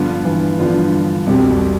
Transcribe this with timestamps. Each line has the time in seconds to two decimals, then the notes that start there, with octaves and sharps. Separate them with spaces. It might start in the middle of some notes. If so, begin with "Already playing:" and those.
Already playing: G2 D3 F3 B3 F4
0.25 E3
0.59 G2 D3 F3 B3 F4
1.27 C2 F2 B2 G3 C4 G4
1.49 F2